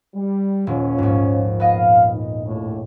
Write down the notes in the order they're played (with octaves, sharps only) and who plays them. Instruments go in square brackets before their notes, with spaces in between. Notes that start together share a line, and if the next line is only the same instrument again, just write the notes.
[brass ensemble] G3
[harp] D#1 [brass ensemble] F3 C#4
[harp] A#1 G#2
[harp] B3 D#5 [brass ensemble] F5
[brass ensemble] D#4
A#1 D#2 A2